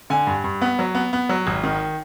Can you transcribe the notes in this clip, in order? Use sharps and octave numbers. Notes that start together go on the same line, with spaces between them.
D3 G#5
G2
G2
B3
F#3
B3
B3
F#3
G#1
D#3